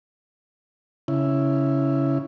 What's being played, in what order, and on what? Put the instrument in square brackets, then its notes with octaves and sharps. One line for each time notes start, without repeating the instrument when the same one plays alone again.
[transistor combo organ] C#3 E4